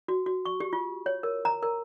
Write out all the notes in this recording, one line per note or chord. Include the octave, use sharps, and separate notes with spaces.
F#4
F#4
C#6
G4
F4
C#5
A#4
A#5
A#4